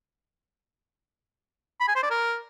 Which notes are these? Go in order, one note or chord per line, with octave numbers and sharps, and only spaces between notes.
B5
G#5
C5
D5
A#4